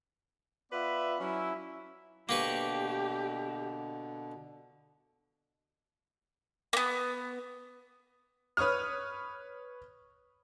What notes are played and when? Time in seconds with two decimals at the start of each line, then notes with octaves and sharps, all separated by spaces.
0.72 B3 F4 B4 D5 E5 B5
1.20 F#3 C#4 E4
2.29 B2 D3 A#3 G4 B4 C#6
6.73 A#3 B3
8.57 B4 C#5 C#6 D#6 F6